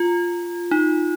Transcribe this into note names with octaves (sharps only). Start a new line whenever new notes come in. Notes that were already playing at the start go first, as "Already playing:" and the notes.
Already playing: F4
D#4